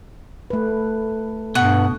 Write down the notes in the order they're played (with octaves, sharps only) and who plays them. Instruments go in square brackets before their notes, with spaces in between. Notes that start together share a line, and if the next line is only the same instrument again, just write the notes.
[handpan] A3 B4
[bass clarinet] G2 [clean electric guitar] B2 [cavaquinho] F#5